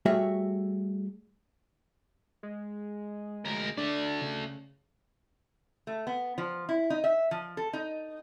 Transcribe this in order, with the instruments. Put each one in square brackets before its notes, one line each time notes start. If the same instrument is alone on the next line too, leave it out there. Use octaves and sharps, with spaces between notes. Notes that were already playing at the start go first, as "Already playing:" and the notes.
[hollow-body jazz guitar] G3 A3 F#4 G#4 C#5 E5
[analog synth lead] G#3
[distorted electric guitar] D2 A#4
[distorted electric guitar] A3 D5 [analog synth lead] D4
[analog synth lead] C#3
[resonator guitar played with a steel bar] A3
B3
F3
E4
D#4
E5
F3
A4
D#4